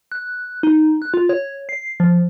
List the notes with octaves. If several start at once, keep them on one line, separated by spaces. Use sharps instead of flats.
F#6
D#4
F#6
F4
C#5
C7
F3